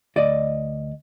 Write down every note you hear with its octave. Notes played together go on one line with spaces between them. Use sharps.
D2 D5 D#5